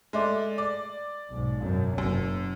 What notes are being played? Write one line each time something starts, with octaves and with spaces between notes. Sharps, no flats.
G#3 A3 D5
D5
B1 G#2
F#2 B2
F#1 F#2